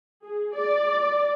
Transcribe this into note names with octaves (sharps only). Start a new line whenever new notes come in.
G#4
D5